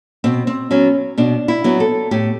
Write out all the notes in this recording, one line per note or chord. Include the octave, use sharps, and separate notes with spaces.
B2 C4
C4
F#3 B3 C#4
B2 D4
E4
F#3 B3
A4
A2 G4